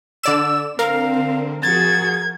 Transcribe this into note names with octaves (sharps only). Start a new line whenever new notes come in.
D3 D5 E6 E7
D3 C4 A#4 F5
F3 F#4 G#4 G#6 A6